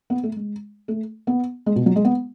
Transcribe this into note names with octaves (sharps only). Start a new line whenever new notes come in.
B3
A3
G#3
A3
B3
G#3
B2
F#3
G#3
B3